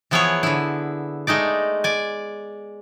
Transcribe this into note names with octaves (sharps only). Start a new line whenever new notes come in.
E3 F3 B3 E4 G#4 C#5
D3 E4
G#3 A3 D#4 D5
D5 G#5